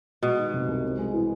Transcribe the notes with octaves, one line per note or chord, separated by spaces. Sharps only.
B2 G#3
D#3
C3
C2
C4
G#3
E3